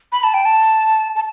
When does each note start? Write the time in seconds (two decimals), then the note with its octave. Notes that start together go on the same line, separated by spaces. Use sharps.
0.12 B5
0.23 A5
0.34 G5
0.45 A5
1.16 A5